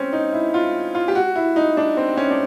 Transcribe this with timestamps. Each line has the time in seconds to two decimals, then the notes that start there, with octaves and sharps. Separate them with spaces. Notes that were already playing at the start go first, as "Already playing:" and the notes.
Already playing: C4 C#4
0.13 D#4
0.33 E4
0.54 F4
0.95 F4
1.08 G4
1.15 F#4
1.36 E4
1.56 D#4
1.77 D4
1.97 C4
2.17 C#4
2.31 D4